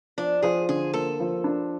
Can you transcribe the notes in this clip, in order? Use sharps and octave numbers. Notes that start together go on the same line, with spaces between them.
F3 D4
F3 G#4
D3 G#4
A#3 A4
F3
D4